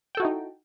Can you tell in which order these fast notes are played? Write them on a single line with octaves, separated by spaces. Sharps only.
G5 A4 F#4 E4 D#4